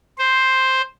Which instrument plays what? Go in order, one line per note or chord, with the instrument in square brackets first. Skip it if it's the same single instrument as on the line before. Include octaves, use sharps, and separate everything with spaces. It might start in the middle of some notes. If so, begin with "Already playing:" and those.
[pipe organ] C5